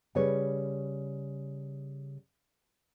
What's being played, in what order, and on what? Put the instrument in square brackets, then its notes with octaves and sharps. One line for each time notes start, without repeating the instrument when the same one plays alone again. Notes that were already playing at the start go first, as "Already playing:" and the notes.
[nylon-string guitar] C#3 G3 B4 C#5